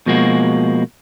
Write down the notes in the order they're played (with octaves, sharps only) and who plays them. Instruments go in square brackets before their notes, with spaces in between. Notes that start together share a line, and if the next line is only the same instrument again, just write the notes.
[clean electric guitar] B2 F3 G#3 A#3 F#4